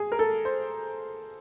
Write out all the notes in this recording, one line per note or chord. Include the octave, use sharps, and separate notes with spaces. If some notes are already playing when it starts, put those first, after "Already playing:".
Already playing: G#4
A#4
A4
C5